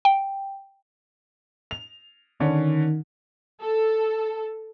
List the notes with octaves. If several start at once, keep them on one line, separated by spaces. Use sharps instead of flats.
G5
F7
D3 D#3 C#4
A4